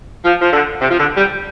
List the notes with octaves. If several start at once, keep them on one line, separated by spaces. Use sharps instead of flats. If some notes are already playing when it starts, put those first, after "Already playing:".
F3
F3
D3
C3
F3
D3
G3